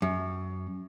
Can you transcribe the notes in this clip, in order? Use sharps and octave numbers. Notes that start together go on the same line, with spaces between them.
F#2